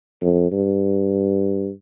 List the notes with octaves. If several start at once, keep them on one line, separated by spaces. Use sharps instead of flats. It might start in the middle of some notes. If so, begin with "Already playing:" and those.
F2
G2